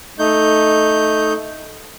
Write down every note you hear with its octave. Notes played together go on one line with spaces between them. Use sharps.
A3 D#4 G6